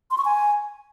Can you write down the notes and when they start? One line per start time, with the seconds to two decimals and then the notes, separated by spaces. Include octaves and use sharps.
0.11 C6
0.18 C#6
0.25 G#5